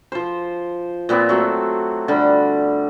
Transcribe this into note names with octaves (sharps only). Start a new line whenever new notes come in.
F3 C5
A#2 B3 C4 D6
F#3 A3 C4
D3 G3 F#5 B5